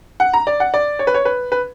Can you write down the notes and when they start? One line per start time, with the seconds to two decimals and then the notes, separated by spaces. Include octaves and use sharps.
0.20 F#5
0.34 A#5
0.47 D5
0.60 F#5
0.74 D5
0.99 C#5
1.07 B4
1.14 C#5
1.25 B4
1.52 B4